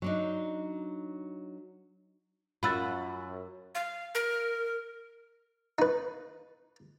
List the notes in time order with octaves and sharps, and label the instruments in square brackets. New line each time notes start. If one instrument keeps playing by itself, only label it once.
[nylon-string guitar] F#3 D4 D#4
[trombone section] F#2 [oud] F4 F#4 [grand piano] B5 E6 A6
[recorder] F5
A#4
[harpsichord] D#4 B4